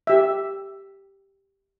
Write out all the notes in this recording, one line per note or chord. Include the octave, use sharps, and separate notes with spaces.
G4 E5